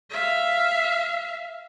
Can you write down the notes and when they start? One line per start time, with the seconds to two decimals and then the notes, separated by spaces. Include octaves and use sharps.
0.11 E5 F5